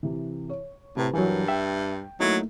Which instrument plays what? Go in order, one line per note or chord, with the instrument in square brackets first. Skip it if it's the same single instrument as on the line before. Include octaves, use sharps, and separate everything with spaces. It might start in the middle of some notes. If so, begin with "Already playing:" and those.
[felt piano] C3 E3
C#5
[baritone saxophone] A2 [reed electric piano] C3 [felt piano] B4 A#5
[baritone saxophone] G2 [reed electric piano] E3 F#3 [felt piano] A#4 G#5
[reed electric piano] E5 [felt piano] G5
[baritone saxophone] F#3 [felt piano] A3 A#3 [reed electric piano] D#4 E4